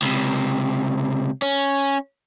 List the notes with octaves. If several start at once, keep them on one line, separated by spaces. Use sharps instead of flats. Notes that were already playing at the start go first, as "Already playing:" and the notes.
C#2 C3
C#4